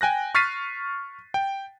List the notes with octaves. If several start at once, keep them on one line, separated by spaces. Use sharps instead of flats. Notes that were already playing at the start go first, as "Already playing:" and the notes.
G5 G#5 F#6 A#6
C#6 F6 A6 B6 C7 D#7
G5